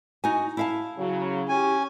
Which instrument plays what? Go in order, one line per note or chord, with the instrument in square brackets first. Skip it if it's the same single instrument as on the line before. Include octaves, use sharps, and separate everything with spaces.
[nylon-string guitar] D#4 F#4 G#5
E4 F5 A5
[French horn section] C#3 F#3
[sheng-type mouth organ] C#4 G#5 [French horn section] G4